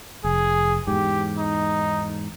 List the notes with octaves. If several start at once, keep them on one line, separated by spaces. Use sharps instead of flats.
F1 G#4
E2 G#2 G4
D#4